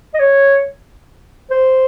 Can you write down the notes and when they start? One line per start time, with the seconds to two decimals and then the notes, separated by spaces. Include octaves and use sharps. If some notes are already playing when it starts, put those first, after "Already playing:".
0.14 D#5
0.19 C#5
1.51 C5